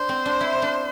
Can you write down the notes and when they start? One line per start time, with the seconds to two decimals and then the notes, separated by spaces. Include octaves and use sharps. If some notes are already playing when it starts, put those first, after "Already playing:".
Already playing: D4 C5
0.09 C4
0.25 D4
0.41 E4
0.62 D4